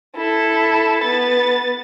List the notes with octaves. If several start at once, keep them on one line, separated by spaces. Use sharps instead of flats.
E4 A4
B3 A6